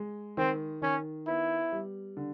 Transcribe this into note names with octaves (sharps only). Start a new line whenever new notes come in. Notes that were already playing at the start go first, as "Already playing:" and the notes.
Already playing: G#3
D#3 C4
D#3 C#4
B3 E4
G3
D3